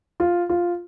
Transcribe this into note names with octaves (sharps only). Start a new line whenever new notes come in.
F4
F4